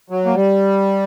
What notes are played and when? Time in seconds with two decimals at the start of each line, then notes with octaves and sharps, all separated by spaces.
0.10 F#3
0.26 A#3
0.34 G3